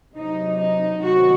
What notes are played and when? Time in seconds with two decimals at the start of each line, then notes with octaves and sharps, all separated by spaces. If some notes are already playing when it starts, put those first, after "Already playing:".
0.15 C3 F#3 D#4
0.59 D#4
1.04 C3 D#3 F#3 F#4